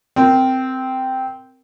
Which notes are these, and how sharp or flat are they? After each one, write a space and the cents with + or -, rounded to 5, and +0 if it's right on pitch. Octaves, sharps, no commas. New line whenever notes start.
C4 -5 A#4 +0